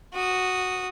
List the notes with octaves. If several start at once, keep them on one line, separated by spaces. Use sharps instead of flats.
F#4 D#6